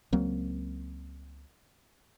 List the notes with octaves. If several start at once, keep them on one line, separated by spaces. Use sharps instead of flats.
C#2 F#3 A#3 C4